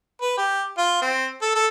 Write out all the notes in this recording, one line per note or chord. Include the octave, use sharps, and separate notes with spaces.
B4
G4
F4
C4
A4
A4